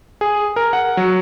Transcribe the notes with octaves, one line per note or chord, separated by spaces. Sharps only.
G#4
A#4
F#5
F#3